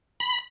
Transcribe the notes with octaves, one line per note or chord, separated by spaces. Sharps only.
B5